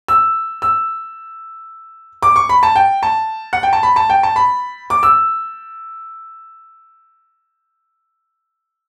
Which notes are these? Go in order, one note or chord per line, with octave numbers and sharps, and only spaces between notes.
E6
E6
D6
C#6
B5
A5
G5
A5
F#5
G5
A5
B5
A5
G5
A5
B5
D6
E6